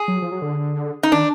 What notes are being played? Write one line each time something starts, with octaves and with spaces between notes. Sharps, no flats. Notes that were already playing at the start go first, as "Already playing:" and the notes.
Already playing: G#4
F#3
F3
F#3
D3
D#4
D#3 D4